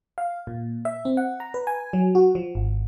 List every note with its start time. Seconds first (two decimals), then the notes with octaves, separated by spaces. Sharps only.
0.18 F5
0.47 A#2
0.85 E5
1.05 C4
1.17 F#5
1.40 A#5
1.54 B4
1.67 G#5
1.93 F#3
2.15 F#4
2.35 F3
2.55 G#1